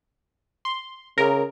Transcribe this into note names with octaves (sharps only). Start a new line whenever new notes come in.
C6
C#3 A#4